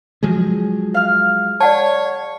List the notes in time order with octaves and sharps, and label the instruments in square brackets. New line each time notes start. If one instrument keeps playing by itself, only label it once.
[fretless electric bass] F3 F#3 G#3 [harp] G#4
[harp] F5 F6
[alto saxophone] C#5 [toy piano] D5 F#5 A5